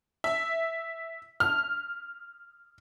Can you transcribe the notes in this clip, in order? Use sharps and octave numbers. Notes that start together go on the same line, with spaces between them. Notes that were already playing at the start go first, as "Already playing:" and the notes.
E5
F6